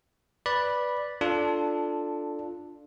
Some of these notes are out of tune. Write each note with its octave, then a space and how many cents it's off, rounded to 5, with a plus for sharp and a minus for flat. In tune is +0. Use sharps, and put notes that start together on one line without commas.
B4 +0 D5 +0 B5 -10
D4 +5 F4 +0 A4 -5